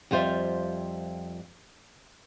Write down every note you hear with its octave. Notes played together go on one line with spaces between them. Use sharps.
F2 G3 F4 C5 E5 F5